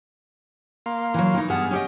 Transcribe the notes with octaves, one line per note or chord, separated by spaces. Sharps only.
A#3 F5 C6
E3 F#3
E3 D#4
G2 B3 G#4 F#5 A5 F6
C#4 G4 D#5